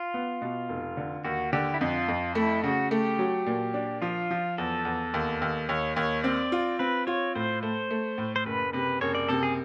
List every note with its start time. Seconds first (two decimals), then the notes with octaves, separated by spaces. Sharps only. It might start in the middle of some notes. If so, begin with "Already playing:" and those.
Already playing: F4
0.14 B3
0.42 B2
0.69 F1
0.97 D3
1.25 D#2 F#4
1.53 D3 G4
1.74 E4
1.81 F2 F4
2.08 F2
2.35 A3 E4
2.63 C#3 F#4
2.91 A3 G4
3.19 F#3
3.46 A#2
3.74 D4
4.02 F3 F4
4.31 F3
4.58 E2 A4
4.85 E2
5.14 D#2
5.41 D#2
5.69 D#2 C#5
5.96 D#2 C#5
6.24 C4 D5
6.52 F4
6.79 C4 B4
7.07 F4 C#5
7.35 A2 C5
7.63 A3 C5
7.91 A3
8.18 A2
8.36 C5
8.46 F#1 B4
8.73 C3 B4
9.01 F#1 C#5
9.15 D5
9.28 C3 A4
9.43 G#4